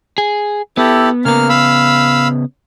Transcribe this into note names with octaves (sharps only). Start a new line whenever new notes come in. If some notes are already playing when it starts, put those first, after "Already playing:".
G#4
B3 E4 G4 A4
C#3 A#3 B3 F6
F5 B5 E6